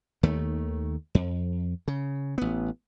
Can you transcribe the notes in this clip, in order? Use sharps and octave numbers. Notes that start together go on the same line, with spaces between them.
D#2 D#3 A3
F2
C#3
A1 B3